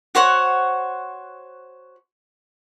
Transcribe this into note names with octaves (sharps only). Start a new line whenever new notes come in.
F#4 C5 C#5 F#5